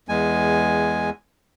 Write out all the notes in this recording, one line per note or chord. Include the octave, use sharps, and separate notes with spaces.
E2 G#3 G#5